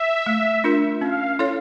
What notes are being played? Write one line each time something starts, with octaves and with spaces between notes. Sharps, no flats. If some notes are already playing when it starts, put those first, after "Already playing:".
Already playing: E5
A3
D4 F4 A#4
C#4 F5
E4 A4 C#5